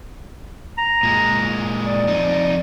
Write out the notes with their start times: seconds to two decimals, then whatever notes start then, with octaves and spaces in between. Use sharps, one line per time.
0.78 A#5
1.03 A#2 G#3
1.85 D5
2.07 F2 D#4